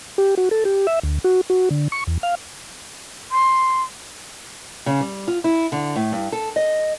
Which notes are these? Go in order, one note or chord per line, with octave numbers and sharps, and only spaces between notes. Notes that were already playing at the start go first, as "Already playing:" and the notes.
G4
F#4
A4
G4
E5
D2
F#4
F#4
D3
C#6
E2
F5
C6
C#3
G3
F4
E4
D3
A2
G2
A4
D#5